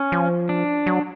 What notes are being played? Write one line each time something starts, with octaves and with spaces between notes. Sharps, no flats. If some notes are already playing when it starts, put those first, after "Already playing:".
Already playing: C#4
F3
D4
F#3